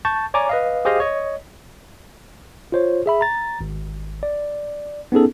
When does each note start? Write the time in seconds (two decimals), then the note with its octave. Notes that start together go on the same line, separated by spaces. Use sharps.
0.05 A5 C#6 G6 A6
0.34 C#5 D5 G#5 A#5 D6
0.49 B4 D#5 F5
0.85 G4 G#4 C5 D#5 F5
1.00 C#5 D#5
2.72 F4 C5 C#5
3.06 G#4 E5 B5
3.21 A#5 A6
3.61 G#1
4.23 D5
5.12 B3 C#4 D#4 G#4 A4